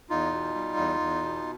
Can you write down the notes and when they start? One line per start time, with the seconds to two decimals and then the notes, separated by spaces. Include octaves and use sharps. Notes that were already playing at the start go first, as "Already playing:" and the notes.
0.10 E2 D#4 F4
0.32 B2
0.55 G3
0.77 E2
1.00 E2
1.23 B2